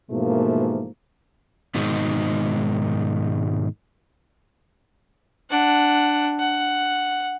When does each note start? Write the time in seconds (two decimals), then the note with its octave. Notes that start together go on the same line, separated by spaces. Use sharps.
0.11 G#2 B2 E3 F3 A3 A#3
1.75 G#2 B2 D#3 G#3 D#4
5.50 D4 F#5
6.40 F#5